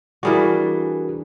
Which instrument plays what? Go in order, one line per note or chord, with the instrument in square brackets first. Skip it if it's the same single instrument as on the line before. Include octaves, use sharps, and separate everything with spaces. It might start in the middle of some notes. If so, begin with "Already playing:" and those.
[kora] E3 G3 D4 [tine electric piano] F#4 G#4 A#4